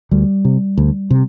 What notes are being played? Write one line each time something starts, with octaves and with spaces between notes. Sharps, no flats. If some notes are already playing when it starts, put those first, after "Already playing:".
D2 G3
C3
D2
C3